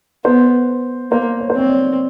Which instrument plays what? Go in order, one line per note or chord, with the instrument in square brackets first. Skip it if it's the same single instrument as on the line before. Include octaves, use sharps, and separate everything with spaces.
[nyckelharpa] B3 [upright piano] C5
[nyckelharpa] A#3 [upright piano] C5
[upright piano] C#5
C5
[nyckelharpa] C4 [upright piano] C#5
[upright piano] D5